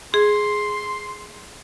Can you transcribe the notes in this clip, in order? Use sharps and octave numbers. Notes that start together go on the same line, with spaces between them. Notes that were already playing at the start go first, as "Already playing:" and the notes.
G#4 C6